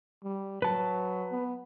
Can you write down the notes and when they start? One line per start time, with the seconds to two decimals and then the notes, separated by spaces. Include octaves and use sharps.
0.24 G3
0.62 F#3 B4 A5
1.32 B3